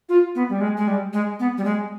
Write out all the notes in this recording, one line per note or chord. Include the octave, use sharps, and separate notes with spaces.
F4
B3
G3
G#3
G#3
G3
G#3
B3
G3
G#3